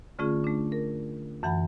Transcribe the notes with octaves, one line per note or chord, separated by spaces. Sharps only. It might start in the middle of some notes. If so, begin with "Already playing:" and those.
D3 A3 C#4 F4 G#4
A3 D4
A#4
F#2 E3 F#5 G#5 B5